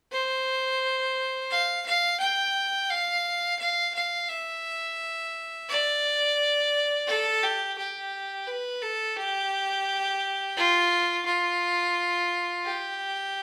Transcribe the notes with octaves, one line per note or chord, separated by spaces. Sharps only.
C5
F5
F5
G5
F5
F5
F5
E5
D5
A4
G4
G4
B4
A4
G4
F4
F4
G4